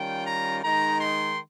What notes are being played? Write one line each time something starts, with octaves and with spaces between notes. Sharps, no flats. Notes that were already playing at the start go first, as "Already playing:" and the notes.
Already playing: D#3 G3 C#4 F4 G5
A#5
D#3 G#3 D#4 A#5
C6